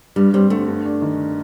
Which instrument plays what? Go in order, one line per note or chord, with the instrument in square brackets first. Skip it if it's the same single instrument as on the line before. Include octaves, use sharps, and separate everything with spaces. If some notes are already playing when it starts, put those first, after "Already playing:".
[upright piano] G2 [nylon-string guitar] G3
[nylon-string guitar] G3 [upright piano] C4
[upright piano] D3 [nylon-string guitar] A3
[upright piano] G2
D4
D#3